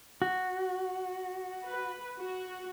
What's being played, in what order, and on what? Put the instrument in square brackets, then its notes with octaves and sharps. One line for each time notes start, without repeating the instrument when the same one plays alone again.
[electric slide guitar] F#4
[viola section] B4
F#4